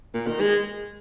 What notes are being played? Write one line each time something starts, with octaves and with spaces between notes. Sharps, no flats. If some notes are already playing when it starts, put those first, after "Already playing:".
A#2
D#3
G#3